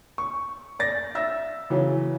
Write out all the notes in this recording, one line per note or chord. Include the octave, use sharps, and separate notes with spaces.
C#6
D5 A6 A#6
E5 E6 A#6
C#3 E3 F#3 C#4